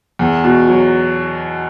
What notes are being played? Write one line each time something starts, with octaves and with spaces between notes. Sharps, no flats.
E2
B2
F#3